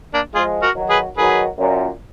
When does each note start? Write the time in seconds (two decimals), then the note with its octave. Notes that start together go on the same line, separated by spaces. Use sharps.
0.14 A#3 D4
0.34 F3 G#3 F4 G#4
0.62 F#4 A#4
0.75 D#3 F#3
0.90 G#4 B4
1.17 D#3 F#3 G#4 B4
1.58 F#2 A#2